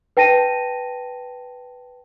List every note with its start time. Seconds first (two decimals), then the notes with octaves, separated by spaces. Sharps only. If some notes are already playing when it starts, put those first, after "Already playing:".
0.17 B4 G5 A5 A#6 D#7